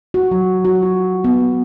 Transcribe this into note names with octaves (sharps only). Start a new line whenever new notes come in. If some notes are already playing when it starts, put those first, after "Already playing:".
F#4
F#3
F#4
F4
B3